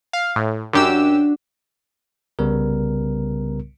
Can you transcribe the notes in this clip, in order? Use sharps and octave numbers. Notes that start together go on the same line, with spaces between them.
F5
A2
F#2 D4 F#4 G4 E6
C2 C#3 G3 B3 A#4